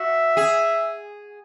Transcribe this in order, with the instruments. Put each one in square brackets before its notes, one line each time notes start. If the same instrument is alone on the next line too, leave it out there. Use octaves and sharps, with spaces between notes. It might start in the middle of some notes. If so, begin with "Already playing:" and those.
Already playing: [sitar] F#4 [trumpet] E5
[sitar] G#4